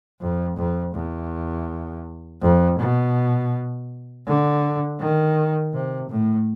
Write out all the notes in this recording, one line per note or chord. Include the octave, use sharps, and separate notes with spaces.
F2
F2
E2
F2
B2
D3
D#3
C3
A2